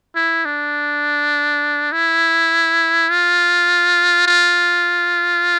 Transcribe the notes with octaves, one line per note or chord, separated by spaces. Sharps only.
E4
D4
E4
F4
F4